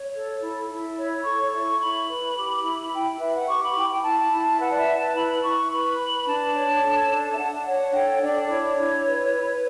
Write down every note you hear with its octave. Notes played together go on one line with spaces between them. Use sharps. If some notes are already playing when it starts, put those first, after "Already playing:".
Already playing: C#5
A4
E4
E4
C#5
A4 C#6
E4
E4 B5
B4
G4
E4
E4 G5
B4 E5
F#5
G4 C#6
B5
E4 G5
G5
E4 A5
E4
B4 F#5
D5
E5
B4
A5
E4 B5
E4 C#6
B4 B5
B4
D4 A5
C#5
A4
D4
E5
D4 F#5
C#5 F#5
A4 G5
D4 D5
E4 C#5
E4
B4
B4